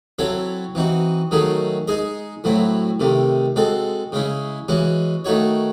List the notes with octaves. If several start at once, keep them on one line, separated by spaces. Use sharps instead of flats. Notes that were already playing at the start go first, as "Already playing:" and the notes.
F#3 C4 E4 A4 C#5
E3 C4 D#4 F#4
D#3 F#3 A3 D#4 G#4
G#3 D#4 G#4 D#5
A2 F#3 C4 E4
C3 D#3 A3
G#3 C4 F#4 A4
C#3 G#3 C#4 E4
E3 G#3 C#4 F#4
D#3 A3 D#4 F#4 C#5